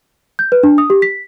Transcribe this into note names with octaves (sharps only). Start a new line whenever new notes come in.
G6
B4
D4
D#6
G4
B6